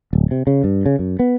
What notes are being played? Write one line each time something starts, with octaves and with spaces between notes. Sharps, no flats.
D1
C3
C#3
G2
C#3
F#2
B3